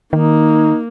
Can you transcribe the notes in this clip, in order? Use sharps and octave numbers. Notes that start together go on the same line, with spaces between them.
D#3 A#3 D#4